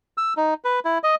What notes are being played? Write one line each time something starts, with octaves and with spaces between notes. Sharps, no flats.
E6
D#4
B4
E4
D#5